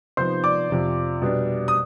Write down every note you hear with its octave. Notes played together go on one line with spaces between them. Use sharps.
C3 F3 B3 D#4 C5 C6
D5 D6
F2 C3 F3
B2 G3 D4
D#6